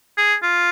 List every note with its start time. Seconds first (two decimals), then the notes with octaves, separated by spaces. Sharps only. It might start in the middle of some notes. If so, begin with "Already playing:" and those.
0.17 G#4
0.43 F4